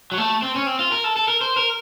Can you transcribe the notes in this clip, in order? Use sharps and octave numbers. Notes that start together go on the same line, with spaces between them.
F#3
A3
C4
C#4
C4
F4
A#4
A4
A4
A#4
C5
A#4